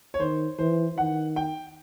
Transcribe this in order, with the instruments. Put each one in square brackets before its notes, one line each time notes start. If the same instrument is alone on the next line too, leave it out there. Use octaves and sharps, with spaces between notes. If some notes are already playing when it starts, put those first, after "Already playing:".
[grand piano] C#5
[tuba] D#3 [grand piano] C5
[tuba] E3 [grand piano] C5
[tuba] D#3 [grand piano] F#5
[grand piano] G5